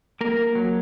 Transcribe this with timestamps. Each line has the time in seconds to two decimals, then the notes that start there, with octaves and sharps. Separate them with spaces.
0.21 A#3 A#4
0.55 F#3